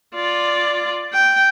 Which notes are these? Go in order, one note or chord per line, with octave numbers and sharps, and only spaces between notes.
F4 D5
G5